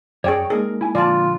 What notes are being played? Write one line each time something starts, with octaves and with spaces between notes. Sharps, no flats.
F#2 G#4 C#5 D5 G5 C#6
G#3 A#3 D#4 G#4 A#4
E4 G#5
A#2 D3 F3 F4 D5 A5